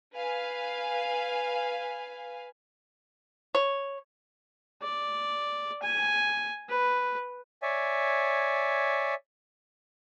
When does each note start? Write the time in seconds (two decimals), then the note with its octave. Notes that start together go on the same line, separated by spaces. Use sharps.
0.16 B4 F5 G#5
3.55 C#5
4.82 D5
5.82 G#5
6.69 B4
7.62 C#5 D5 E5 G#5